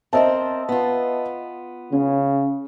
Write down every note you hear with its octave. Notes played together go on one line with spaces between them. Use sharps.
C4 A#4 C5 D#5 E5 A5
B3 F4
C#3 C#4